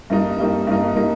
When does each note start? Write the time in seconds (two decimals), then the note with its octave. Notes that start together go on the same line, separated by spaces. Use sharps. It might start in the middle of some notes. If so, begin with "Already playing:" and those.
0.10 G2 G3 A#3 D#4
0.38 G2 G3 A#3 D#4
0.67 G2 G3 A#3 D#4
0.96 G3 A#3 D#4